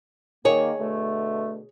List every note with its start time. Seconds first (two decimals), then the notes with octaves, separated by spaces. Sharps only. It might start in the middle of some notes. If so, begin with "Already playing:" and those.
0.45 D#3 A#3 G#4 C#5
0.80 B2 D3 A3